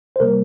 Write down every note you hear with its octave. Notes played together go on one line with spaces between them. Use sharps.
C5
C3 G3 A#3 A#4